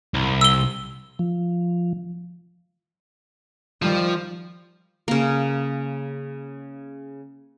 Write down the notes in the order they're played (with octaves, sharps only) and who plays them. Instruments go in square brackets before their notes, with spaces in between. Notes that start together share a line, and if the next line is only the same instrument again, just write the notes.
[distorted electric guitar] C2
[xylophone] E6 G7
[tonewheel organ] F3
[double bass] D#3 G3 [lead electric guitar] F3
[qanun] C#3 A#3